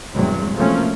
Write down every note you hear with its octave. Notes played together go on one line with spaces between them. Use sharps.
E2 G2 C3 F#3 G#3
C3 F3 F#3 A3 A#3 C#4